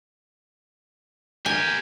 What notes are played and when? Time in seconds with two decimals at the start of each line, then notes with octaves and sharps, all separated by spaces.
1.46 G4 A#4 G#5